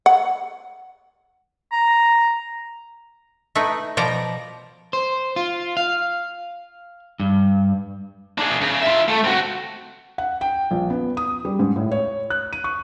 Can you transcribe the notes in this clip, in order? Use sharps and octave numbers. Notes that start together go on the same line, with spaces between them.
F#5
A#5
A3 D#4 E4 B4
B2 F3 D5 A#5
C5
F4
F5
G2
D4 G#4
C#3
F4 E5
A3
C4 F#4
F#5
G5
A#1
B3
D#6
G3
G#2
A2
C#5
F#6
D#7
C#6